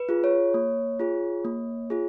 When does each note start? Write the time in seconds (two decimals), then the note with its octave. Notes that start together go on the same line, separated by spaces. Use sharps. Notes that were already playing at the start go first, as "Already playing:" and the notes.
Already playing: B4
0.09 F4 G#4
0.24 C#5
0.54 A#3
0.99 F4 G#4
1.45 A#3
1.90 F4 G#4